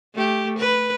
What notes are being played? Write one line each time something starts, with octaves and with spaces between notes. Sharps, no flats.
A3 G4
B4